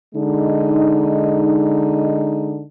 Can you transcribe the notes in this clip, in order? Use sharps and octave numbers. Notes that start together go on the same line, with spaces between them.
D3 G#3 D#4